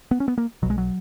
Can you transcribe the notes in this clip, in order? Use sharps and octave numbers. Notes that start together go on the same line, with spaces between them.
B3
C#4
B3
A#3
B1 B2 F#3 G#3
F#3